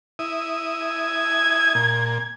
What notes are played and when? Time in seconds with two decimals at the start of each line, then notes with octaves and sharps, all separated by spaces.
0.19 E4 D#6
0.87 G#6
1.75 A#2